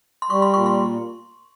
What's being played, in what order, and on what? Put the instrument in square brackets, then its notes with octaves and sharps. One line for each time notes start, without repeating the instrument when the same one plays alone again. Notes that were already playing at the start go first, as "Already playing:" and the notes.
[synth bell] C6
[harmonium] G3 [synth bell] C#6
[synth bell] C6
[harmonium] A#2 [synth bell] C#6
[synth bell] C6